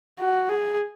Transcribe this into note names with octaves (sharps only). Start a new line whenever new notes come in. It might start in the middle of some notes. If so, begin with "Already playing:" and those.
F#4
G#4